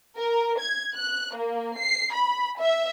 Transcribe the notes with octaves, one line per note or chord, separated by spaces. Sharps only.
A#4
G#6
F#6
A#3
C7
B5
E5